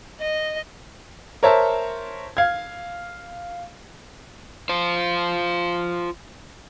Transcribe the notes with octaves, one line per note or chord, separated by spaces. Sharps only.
D#5
A#4 C5 C#5 E5 A5
F5 G#6
F4 C5